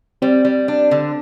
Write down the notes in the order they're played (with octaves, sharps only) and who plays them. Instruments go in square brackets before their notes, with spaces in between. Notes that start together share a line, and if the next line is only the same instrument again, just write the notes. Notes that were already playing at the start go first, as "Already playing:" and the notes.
[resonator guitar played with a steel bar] G3 [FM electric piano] C4
[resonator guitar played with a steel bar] G3
D4
D3